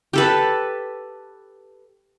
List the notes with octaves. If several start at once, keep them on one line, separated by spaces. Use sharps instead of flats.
G4 A4 B4